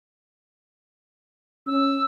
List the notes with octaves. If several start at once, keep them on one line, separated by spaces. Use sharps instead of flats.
C#4 E6